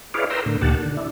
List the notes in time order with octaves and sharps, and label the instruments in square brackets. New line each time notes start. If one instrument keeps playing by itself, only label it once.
[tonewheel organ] E4 G#4 B4 C#5 D5 F5
A#4 B4 G5 A#5 C6 E6
A2 D3
D2 A#2 D#3 G4 F#5 A5
D3
D4 E4